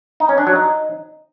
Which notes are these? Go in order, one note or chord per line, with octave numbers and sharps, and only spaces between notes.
D#4
C#4
D4
F#3
D#4